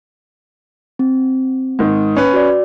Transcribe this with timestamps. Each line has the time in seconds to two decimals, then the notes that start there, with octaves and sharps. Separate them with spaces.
0.99 C4
1.79 G#2 D#3
2.17 C#4 B4
2.33 F#4 D5